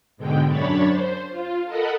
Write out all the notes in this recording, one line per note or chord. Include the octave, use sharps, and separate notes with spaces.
G#2 B2 D3 G#3 G5
F#2 D4 C#5 B5 A6
C5
F4
A4 A#4 D#5 F#5 B5